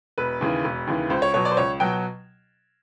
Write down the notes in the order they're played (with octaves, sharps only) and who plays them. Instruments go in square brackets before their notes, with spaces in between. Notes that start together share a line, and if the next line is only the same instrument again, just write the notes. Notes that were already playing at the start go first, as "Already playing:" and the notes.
[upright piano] E1 B4
D#2 C#3 E3
E1
D#2 C#3 E3
C#2 C5
C#5
B2 F#3 C#5
D5
C5
C#2 C#5
B2 F#3 G5